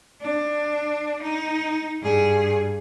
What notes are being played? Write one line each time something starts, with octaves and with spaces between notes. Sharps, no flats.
D4
D#4
G2 G#4